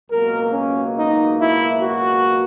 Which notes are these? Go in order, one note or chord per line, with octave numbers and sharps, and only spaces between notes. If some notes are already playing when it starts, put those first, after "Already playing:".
C#2 B2 F#3 A#3 A#4
C#4
D#4
E4
F#4